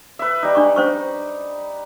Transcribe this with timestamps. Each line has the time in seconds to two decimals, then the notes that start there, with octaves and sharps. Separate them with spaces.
0.19 B4 E5
0.42 G3 D#4
0.55 D4 C#6
0.76 C#4 C5 C#6